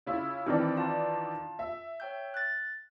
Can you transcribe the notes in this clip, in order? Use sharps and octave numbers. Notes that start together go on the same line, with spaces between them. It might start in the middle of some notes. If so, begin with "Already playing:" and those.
C#3 E4 F4
D#3 E3 C4 D4 E4
F4 F5 A5
E5
C#5 G5 G6
F#6 A6